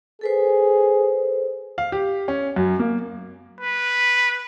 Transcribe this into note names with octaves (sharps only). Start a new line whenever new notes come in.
G#4 A4 B4 C5
F5
G4
C#4
F#2
A#3
B4